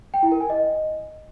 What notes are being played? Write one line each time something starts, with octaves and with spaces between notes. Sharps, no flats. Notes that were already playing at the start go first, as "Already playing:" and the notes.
G5
E4
A#4
G#5
D#5